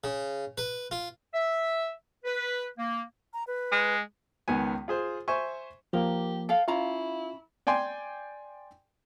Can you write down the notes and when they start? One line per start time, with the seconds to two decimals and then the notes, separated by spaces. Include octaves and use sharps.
0.04 C#3
0.58 B4
0.91 F4
1.33 E5
2.25 B4
2.78 A#3
3.33 A#5
3.47 B4
3.72 G#3
4.48 C#2 D#3 B3 G#5
4.88 F4 G#4 C5
5.28 C5 E5 G#5 C#6
5.93 F3 A#3 G4 A#4
6.49 A4 F5 G5
6.68 C#4 E4 F4 F5 A#5
7.67 D5 G5 G#5 C6